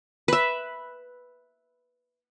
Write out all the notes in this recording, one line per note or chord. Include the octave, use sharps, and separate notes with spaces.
B4 E5